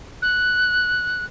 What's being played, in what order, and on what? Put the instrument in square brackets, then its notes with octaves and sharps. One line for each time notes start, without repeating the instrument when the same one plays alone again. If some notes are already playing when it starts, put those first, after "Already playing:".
[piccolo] F#6